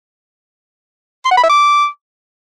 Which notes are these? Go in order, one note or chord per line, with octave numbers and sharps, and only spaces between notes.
C6
F#5
B5
E5
D6